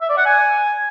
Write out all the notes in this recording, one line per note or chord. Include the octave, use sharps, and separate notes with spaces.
E5
D5
F#5
G#5